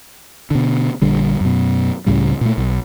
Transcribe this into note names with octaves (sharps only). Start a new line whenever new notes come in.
B2 D3
A#1 D3 G3
F#2 B2
C#2 A2 C#3 G3
A#2 A3
B1